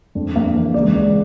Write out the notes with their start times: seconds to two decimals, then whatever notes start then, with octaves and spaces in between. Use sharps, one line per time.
0.15 F2 D4
0.35 F2 A#3
0.55 E3
0.74 C#2 D5
0.94 C#2